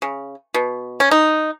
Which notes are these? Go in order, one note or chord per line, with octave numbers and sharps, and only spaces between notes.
C#3
B2
C#4
D#4